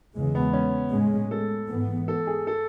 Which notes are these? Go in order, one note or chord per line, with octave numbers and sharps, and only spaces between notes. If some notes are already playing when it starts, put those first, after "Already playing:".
E2 C#3 E3 G#3
B3
C#4
A2 G#3 C#4
A4
G#2 E3 B3
A4
G#4
A4